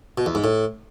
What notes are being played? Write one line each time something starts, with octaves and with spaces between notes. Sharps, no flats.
B2
E2
G#2
A2